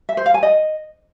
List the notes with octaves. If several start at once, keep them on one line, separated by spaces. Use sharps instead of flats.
E5
C5
F5
G#5
D#5